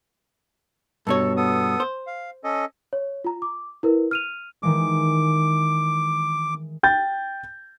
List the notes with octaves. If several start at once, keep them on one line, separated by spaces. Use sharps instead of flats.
G2 B2 A4 C#5
B3 A4 D#6
C5
F5
C#4 A4 D#5
C#5
F4 A#5
D6
E4 A#4 B4
F6 D#7 F7
D#3 E3 G#3 D6
G5 G6 A6